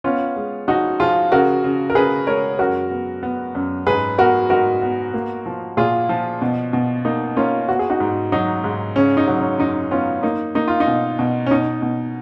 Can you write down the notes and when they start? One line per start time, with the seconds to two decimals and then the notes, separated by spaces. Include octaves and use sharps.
0.04 B3 C#4 F4
0.36 G#3
0.68 F3 D#4 F#4
1.00 F3 F4 G#4
1.31 C#3 F#4 A#4
1.64 C#3
1.90 A#4
1.95 C#3 G#4 B4
2.27 G#3 A#4 C#5
2.59 F#2 F#4 A#4
2.91 B3
3.23 B3
3.55 F#2
3.87 G#2 G#4 B4
4.18 B3 F#4 A#4
4.50 G#2 F#4 A#4
4.82 B3
5.14 A#3
5.46 F3
5.77 A#2 F4 G#4
6.09 F3
6.42 B2
6.73 B2
7.05 A#3 D#4
7.36 A#3 C#4 F4
7.68 B3 F#4
7.79 G#4
7.90 D#4 F#4
8.00 G#2
8.32 F#3 D#4
8.64 G#2
8.96 C#3 C#4
9.17 D#4
9.27 F#3
9.38 C#4
9.59 F#2 D#4
9.91 B3 C#4 F4
10.23 A#3 D#4
10.55 A#3 D#4
10.68 F4
10.80 D#4
10.87 B2
11.19 B2
11.46 C#4
11.51 B2 D#4
11.82 B2